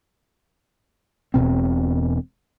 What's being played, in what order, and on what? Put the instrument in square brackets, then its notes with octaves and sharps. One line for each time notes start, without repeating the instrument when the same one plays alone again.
[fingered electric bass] E1 C#2 B2 C4